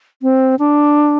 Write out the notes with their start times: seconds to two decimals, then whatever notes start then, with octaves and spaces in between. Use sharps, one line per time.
0.22 C4
0.59 D4